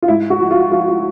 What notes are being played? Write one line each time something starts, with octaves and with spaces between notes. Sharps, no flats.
F4
G#2 E4
F#4
F3
F4
F3 F4
F4